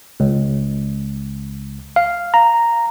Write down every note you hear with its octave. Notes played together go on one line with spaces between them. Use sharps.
C#2
F5
A#5